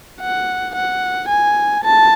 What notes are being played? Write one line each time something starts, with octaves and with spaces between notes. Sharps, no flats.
F#5
F#5
G#5
A5